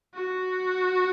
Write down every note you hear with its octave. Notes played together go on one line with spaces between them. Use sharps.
F#4